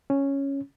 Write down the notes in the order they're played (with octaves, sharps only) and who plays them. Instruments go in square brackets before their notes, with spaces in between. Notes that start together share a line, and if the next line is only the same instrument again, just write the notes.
[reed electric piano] C#4